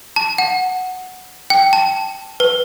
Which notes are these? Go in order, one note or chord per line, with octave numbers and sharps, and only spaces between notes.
A5
F#5
G5
A5
B4